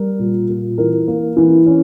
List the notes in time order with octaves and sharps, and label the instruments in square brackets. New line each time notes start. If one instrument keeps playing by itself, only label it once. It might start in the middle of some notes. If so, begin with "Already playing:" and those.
Already playing: [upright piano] G3 A#4
A#2
A#2
E3 A#4
A#3
E3
C#4